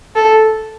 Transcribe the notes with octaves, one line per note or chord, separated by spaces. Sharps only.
A4